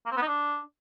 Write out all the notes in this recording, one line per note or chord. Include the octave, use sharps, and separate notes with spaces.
A#3
C4
B3
D#4
D4